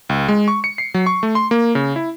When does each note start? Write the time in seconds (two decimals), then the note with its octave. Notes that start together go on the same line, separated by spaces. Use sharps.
0.09 C#2
0.28 G#3
0.48 C#6
0.64 C#7
0.78 C7
0.94 F#3
1.06 C#6
1.23 A3
1.35 C6
1.51 A#3
1.75 C#3
1.96 E4